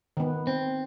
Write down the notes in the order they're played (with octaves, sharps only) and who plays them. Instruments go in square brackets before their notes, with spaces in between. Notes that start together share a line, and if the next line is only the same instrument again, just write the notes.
[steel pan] D#3 B3
[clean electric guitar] C4